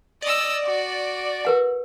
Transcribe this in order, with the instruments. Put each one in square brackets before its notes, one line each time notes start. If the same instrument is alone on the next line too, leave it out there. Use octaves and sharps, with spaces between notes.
[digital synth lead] D5 [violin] D#5 E6
[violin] F#4
[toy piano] A#4 B4 F#5